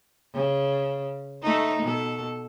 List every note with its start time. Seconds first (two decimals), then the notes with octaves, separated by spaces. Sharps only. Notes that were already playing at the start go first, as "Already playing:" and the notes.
0.34 C#3
1.42 A3 D#4
1.82 B2 A4